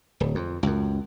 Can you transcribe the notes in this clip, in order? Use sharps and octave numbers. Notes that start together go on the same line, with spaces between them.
D1
F2
C#2 F#2